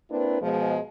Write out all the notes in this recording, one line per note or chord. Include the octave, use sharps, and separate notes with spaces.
A#3 C4 D4 E4 B4
B2 F3 G#3